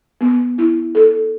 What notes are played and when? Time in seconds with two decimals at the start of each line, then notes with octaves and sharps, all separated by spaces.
0.21 B3
0.58 E4
0.95 A4